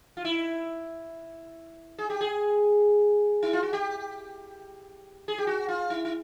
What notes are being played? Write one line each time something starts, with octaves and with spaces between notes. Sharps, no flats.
F4
E4
G#4
G4
G#4
E4
F4
F#4
G4
G#4
G4
F#4
F4
E4
E4